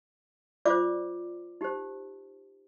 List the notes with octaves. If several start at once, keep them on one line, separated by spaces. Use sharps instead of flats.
F4 C5 D5 D6
D#4 G4 C5